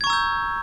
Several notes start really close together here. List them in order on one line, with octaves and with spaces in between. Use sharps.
G#6 C#6 A#5 E6 G6